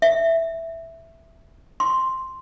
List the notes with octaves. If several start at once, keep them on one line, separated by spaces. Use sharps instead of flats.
E5
C6